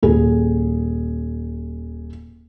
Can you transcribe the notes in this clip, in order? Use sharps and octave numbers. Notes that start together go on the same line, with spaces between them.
D#1 G#4